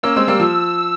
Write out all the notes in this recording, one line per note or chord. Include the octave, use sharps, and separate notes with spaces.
A#3 C#4 E6
G#3 C4
G3 A#3
F3